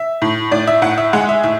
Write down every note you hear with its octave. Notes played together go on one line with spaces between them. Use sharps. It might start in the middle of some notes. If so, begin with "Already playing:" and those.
Already playing: E5
A2
A2 D5
E5
A2 F#5
E5
G#3 F#5
E5
A2 E5